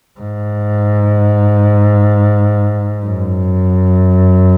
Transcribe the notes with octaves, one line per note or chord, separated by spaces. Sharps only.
G#2
F#2